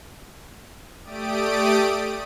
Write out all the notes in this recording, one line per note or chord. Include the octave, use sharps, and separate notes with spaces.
A3 G4 D5 D#6 D7